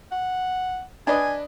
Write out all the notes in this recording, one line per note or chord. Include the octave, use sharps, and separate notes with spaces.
F#5
D4 B4 D#5 G#5